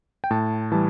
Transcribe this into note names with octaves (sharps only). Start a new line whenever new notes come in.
G5
A2 A5
E3 G3 A5